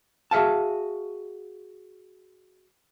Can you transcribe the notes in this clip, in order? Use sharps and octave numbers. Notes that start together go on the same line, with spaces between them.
F#4 G#4 E5 F5 A5